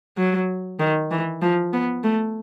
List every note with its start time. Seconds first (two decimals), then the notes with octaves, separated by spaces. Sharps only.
0.17 F#3
0.80 D#3
1.11 E3
1.42 F3
1.73 B3
2.04 A3